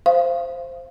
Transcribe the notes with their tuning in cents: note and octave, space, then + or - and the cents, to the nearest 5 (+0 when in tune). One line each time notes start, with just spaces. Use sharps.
C5 +0 F5 -20